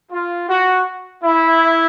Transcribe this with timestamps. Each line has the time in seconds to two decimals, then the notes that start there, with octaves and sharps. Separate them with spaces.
0.11 F4
0.48 F#4
1.24 E4